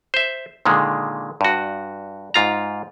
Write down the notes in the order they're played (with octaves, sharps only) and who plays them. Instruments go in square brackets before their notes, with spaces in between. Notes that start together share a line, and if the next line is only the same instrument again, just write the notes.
[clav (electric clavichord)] C5 E5
A#2 D3 D#3 G#3
G2 F#4
G#2 F4 A#5